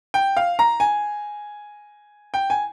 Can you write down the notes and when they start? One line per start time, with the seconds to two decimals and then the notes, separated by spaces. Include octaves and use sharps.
0.14 G5
0.37 F5
0.59 A#5
0.80 G#5
2.34 G5
2.50 G#5